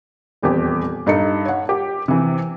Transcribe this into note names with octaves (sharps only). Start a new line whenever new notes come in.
D#1 E2 C4 G4
G2 D#4 A4 C#7
C#5 F#5
G4
C3 E3